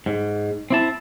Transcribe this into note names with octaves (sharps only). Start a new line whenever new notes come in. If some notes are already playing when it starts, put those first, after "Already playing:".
G#2
C4 E4 A5